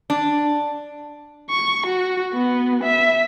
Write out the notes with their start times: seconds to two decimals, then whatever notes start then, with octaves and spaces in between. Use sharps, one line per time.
0.10 D4
1.50 C#6
1.87 F#4
2.34 B3
2.83 E5